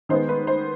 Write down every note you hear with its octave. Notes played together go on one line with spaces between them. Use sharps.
D#3 G#3 B3 C5
B4
C5